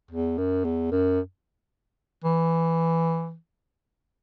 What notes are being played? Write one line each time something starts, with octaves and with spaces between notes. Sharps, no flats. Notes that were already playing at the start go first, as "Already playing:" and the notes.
E2
F#2
E2
F#2
E3